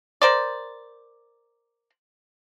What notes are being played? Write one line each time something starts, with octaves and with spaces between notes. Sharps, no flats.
A#4 C5 D5